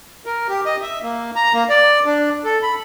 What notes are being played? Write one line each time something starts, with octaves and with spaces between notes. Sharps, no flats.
A#4
G4
D#5
E5
A#3
A#5
A#3
D5
D4
A4
B5